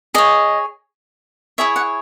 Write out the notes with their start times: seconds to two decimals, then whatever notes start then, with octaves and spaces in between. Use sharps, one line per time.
0.14 G#4 C#5 D#5
1.58 E4 G#4 C#5 E5
1.76 F#5